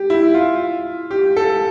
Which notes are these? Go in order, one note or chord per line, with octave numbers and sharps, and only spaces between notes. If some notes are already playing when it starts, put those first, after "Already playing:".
Already playing: G4
E4
F4
G4
A4